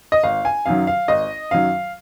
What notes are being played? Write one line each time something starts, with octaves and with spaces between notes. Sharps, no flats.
D#5
G#1 F5
G#5
F#2 D#3 F#3 F5
F5
G#1 D#5
F#2 D#3 F#3 F5